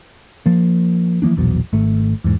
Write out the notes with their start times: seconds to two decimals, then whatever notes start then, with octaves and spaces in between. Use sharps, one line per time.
0.46 F3 A#3
1.22 E3 F3 A#3 D4
1.37 A#1 E2 B2 F#3
1.73 G#1 A3
2.24 E2 G#2